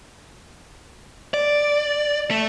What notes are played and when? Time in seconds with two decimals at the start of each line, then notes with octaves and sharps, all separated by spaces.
1.34 D5
2.31 A3